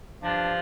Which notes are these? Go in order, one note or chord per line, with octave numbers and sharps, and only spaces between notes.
G2 F3 D4